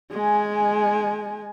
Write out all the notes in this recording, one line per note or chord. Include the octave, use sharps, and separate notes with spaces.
G#3 G#5